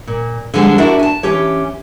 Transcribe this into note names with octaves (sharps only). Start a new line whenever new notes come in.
A#2
D3 F3 G3 G#3 D4 G#5
D4 E4 F#4 A#4 D5 E5
G#5 A5
E3 C#4 G4 C#5